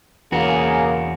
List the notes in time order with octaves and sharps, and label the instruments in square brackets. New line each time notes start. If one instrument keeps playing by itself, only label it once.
[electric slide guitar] E2 F#4 [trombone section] C#3 A#3 G#4